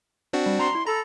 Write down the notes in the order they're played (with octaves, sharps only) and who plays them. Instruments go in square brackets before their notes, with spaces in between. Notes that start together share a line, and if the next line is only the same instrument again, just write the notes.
[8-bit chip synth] C4 D4 F#4
[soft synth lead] G3
[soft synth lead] A#5 [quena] C6
[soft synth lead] E4
[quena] A4 [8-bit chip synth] A#5 [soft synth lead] B5